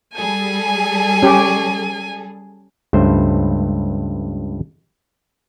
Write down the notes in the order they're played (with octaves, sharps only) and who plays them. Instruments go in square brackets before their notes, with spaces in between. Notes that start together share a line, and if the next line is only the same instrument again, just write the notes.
[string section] G3 G#4 A4 [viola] G#5
[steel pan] C#4 G4
[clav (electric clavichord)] C#2 G2 A3 C5